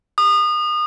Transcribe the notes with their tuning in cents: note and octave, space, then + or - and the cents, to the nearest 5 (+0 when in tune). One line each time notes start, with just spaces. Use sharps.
D#6 -30